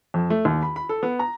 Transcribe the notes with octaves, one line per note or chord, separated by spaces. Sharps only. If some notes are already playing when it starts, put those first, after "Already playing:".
F2
A3
D#2
B5
B5
A4
B3
A#5